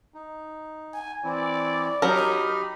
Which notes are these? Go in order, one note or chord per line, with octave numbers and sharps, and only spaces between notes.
D#4
G#5
E3 C4 E4 D5
F#3 D#4 G4 A#4 B5 F6